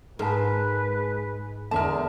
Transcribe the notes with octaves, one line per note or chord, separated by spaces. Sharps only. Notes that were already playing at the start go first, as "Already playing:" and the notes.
G#2 G#3 A#4 B4 A5
E2 D3 G#3 A#4 E5 A5